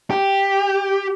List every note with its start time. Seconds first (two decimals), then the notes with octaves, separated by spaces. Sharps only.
0.11 G4